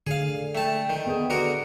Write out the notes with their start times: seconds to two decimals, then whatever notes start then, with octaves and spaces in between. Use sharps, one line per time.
0.07 D3 G#4 F5
0.55 A3 G5 A5
0.90 D#3
1.07 B3 G#4
1.30 D3 F#4 A#4